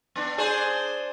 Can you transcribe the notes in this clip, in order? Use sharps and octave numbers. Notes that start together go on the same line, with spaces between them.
B3 D4
D4 G#4 C5